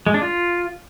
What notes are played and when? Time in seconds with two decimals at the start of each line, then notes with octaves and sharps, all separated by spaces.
0.06 G#3
0.14 D4
0.22 F4